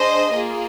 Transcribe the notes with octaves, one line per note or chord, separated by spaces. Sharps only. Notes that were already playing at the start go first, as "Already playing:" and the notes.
Already playing: D4 G#4 C5 D#5
A#3 F4 G#4